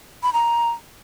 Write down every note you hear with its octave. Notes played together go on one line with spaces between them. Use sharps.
B5
A#5